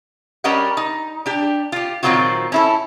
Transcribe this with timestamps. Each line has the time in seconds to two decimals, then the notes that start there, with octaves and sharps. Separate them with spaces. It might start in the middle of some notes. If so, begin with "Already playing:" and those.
0.44 G3 C#4 G4 A#4 D#5 F#5
0.77 D#4
1.26 D4 G4
1.72 F4 G4
2.03 A#2 D#3 F#3 C4 F4 F#4
2.52 C#4 E4 A4